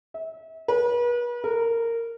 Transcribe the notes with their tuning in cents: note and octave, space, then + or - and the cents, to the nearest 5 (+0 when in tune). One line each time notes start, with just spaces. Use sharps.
E5 -35
B4 -40
A#4 -15